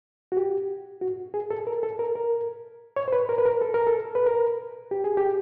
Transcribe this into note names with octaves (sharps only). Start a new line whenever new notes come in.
F#4
G4
F#4
G#4
A4
A#4
A4
A#4
A#4
C#5
C5
B4
A#4
B4
A#4
A4
A#4
A4
B4
A#4
G4
G#4
G4